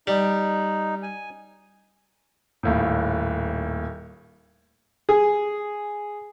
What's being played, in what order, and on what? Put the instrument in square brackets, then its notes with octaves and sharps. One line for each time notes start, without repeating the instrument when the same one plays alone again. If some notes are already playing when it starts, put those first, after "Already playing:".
[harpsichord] G3 [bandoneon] D#4
[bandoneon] G#5
[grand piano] D#1 D#2 A2
[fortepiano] G#4